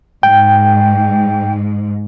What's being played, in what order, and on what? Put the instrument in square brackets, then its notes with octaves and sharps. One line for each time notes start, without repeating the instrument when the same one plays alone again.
[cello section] G#2 [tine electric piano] G5